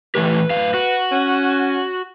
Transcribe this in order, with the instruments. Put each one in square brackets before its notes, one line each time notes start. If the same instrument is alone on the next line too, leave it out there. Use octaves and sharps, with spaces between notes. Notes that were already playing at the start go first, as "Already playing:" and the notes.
[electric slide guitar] E3 A3 G4 [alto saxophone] B4
[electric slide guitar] F#2 A2 F5
F#4
[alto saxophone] C#4